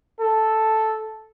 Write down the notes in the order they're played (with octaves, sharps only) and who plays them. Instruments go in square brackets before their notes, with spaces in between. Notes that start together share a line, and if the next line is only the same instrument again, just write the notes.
[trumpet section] A4